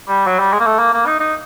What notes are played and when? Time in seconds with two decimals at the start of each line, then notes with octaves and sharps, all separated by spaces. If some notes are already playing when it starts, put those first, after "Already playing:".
0.08 G3
0.26 F#3
0.39 G3
0.52 G#3
0.60 A#3
0.66 A3
0.79 A#3
0.93 A#3
1.06 D#4
1.20 D#4